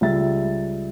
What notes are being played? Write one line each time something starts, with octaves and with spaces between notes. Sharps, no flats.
C#2 G3 E5 A6